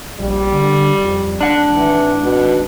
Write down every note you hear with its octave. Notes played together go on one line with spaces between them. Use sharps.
A#1 G3
D3
F2
F1 D4 F#5
G#1 E3
B2